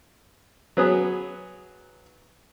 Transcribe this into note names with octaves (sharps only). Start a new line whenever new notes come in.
F#3 B3 G#4